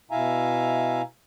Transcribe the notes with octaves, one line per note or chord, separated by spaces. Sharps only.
B2 E4 E5 F5 G#5 A#5